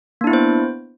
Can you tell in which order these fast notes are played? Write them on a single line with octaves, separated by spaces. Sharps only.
A#3 D4 E4 B3 C5